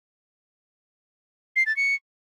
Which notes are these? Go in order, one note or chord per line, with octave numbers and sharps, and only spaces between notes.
C7
A6
C#7